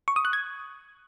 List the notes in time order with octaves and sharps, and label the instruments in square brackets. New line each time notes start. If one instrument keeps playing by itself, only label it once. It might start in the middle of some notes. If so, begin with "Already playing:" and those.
[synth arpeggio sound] C#6
D#6
F#6
G#6